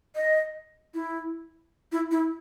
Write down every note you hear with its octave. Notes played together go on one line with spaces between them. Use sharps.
D#5
E4
E4
E4